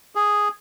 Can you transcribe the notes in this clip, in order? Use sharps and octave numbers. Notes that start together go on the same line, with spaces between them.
G#4